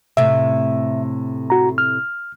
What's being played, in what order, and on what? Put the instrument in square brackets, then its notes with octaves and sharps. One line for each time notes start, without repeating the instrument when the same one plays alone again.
[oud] A2 C3 [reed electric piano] E5
[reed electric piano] F#4 A#5
F6